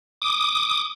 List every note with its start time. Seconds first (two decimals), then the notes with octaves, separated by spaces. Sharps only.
0.22 D6 D#6